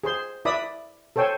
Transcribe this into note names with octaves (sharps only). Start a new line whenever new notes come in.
G#4 C5 C6
E4 B4 D5 E5 B5 D#6
A4 C5 C#5 G5 G#5